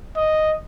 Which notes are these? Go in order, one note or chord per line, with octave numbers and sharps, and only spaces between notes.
D#5